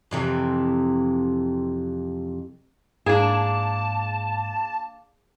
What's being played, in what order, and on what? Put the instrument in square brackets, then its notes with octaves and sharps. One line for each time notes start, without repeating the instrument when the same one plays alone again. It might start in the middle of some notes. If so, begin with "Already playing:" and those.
[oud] F2 C3 E3
[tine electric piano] G#2 [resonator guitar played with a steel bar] A#3 D4 [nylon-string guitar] G#4 [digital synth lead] A5